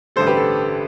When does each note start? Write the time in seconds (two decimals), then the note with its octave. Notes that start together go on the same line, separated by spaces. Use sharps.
0.16 A1 G2 D3 G3 A4 C5
0.27 G4 B4
0.37 A4